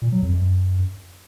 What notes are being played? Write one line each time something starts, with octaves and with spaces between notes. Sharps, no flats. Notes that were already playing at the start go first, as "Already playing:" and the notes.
A#2
F#3
F2
F#2